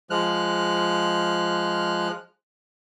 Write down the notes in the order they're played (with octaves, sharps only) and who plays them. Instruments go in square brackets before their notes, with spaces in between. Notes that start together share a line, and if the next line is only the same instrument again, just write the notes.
[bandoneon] F3 G#3 F6 F#6